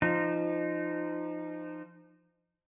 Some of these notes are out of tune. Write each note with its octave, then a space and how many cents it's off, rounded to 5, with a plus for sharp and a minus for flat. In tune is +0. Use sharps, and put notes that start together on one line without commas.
F3 -20 D#4 -15